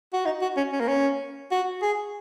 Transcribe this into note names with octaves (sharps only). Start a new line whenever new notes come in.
F#4
D#4
F#4
C#4
C#4
A#3
C#4
F#4
G#4